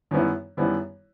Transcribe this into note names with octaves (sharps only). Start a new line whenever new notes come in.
F#2 D#3 G3 B3 E4
F#2 D#3 G3 B3 E4